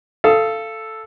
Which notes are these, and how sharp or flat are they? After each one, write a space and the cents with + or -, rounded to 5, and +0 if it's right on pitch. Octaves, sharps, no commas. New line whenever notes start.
A4 +0 F5 -25 D#6 +15